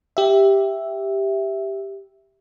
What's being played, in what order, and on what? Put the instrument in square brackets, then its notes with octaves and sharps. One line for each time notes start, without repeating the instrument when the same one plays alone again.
[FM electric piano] G4 E5